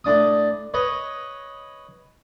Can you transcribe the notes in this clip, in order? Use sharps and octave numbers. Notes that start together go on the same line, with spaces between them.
A2 D4 D#6
B4 C#5 D#5